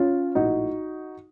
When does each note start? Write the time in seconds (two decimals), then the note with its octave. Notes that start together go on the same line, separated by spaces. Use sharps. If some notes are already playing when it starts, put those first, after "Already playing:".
Already playing: C#4 F4
0.35 A#1 A2 D#4 F#4